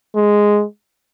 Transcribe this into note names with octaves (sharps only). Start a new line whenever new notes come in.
G#3